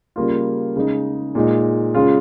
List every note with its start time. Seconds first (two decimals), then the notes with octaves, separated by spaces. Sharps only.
0.16 C#3 G3 A#3 F4
0.76 C#3 G#3 D#4
1.35 A#2 G#3 D#4
1.95 C#3 G#3 C#4 F4